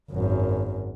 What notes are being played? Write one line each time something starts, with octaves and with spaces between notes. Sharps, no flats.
G#1 F#2